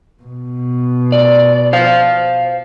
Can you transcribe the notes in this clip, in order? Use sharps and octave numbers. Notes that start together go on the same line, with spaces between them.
B2
D5
C5 F5